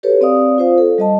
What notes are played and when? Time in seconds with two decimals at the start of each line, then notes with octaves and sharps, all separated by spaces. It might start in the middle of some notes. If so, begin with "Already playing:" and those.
0.03 F#4 G4 A4 B4 C#5
0.21 C4 D5 F5 D#6
0.58 F4 C5 F5
0.78 A4
0.98 G3 D#5 A5